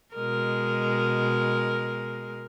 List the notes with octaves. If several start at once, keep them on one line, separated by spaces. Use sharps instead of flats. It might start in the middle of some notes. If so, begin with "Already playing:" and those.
B2 G#3 A#4